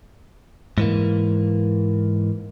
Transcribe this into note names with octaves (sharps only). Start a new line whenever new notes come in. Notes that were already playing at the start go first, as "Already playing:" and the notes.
G#2 E3 A#3